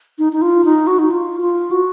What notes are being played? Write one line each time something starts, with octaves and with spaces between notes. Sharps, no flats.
D#4
D#4
F4
D#4
F#4
D#4
F4
F4
F#4